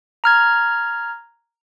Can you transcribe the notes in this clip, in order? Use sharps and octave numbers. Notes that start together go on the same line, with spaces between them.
A#5 F6 G#6